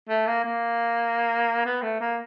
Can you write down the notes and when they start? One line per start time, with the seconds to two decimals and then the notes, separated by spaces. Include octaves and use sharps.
0.09 A3
0.27 A#3
0.44 A#3
1.66 B3
1.82 A3
2.00 A#3